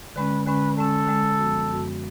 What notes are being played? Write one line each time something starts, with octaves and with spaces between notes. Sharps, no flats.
D3 G#3 C#4 B4
D3 G#3 C#4 B4
D3 G#3 C#4 A4
D3 G#3 C#4
F#2 F3 B3 F#4
F#2 F3 B3 F#4